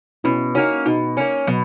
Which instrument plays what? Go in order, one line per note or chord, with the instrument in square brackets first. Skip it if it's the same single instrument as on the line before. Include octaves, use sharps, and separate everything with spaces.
[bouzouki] B2 [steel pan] C#4 E4
[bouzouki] A#3 C#4 [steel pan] D#4 F#4
[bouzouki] B2 [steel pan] D#4 F#4
[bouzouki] A#3 C#4
[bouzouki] B2 [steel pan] F#3